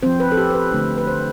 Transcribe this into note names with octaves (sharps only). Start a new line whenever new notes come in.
F3 C4 C5
B4
A4
G4
C5
B4
D3 A3 D4
B4
C5